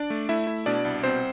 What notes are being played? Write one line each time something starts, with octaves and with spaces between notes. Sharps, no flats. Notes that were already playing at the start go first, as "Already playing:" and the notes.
Already playing: D4 D5
A3
A3 E4 E5
E4
B2 D4 D5
C2
B2 C4 C5